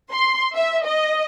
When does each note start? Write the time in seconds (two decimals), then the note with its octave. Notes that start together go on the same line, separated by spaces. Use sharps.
0.12 C6
0.55 E5
0.86 D#5